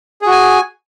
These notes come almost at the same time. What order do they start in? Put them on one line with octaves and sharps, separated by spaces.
G#4 F#4 G#5